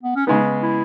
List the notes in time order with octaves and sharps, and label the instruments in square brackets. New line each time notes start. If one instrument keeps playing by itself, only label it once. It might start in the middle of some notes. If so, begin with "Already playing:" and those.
[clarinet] B3
C#4
[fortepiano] C#3 G#3 B3 [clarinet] D#4
[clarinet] E4